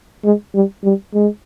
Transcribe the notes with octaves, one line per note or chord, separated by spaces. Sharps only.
G#3
G3
G3
G#3